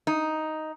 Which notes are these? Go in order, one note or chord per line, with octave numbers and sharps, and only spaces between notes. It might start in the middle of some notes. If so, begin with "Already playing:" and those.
D#4